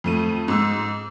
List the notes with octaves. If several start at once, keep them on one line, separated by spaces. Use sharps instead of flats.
F2 A3 D#7
G#2 E6